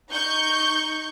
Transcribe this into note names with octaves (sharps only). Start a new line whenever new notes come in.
D#4 C#6 G6